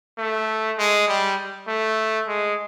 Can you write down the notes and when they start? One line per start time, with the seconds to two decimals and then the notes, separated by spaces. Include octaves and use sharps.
0.18 A3
0.78 G#3
1.08 G3
1.68 A3
2.28 G#3